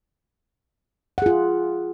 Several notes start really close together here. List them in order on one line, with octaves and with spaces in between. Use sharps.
F#5 G#4 F4